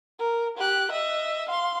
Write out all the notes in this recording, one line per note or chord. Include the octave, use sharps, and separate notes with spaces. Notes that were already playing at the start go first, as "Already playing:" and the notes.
A#4
G4 F#6
D#5 E5
F5 C6